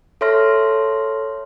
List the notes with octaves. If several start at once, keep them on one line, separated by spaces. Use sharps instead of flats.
A4 C#5 E5 C6 F6 A#6